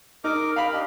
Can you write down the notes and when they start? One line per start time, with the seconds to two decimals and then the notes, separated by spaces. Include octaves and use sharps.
0.24 D#4 A#4 D6
0.56 A#4 F5 G5 B5
0.73 D4 G4 D#5